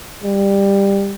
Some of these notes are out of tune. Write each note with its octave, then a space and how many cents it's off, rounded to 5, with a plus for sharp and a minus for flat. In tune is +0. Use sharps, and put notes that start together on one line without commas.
G3 +15